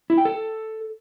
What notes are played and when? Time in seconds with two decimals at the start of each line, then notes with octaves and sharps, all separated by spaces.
0.10 E4
0.18 G5
0.25 A4